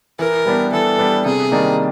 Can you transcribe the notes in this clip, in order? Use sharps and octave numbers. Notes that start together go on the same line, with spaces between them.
E3 A#4
G3 B3 D4
E3 A4
G3 B3 D4
C3 G#4
D#3 G3 A#3 D4